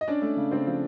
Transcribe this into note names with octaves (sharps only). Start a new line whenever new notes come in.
D#5
C#4 D4 D5
A3
C#3
C#3 C4 C5
F3